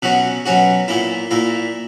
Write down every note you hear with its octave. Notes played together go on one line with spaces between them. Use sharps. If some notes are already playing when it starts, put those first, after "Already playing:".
B2 F#3 C#4 F#4
B2 F#3 C#4 F#4
A#2 A#3 E4
A#2 A#3 E4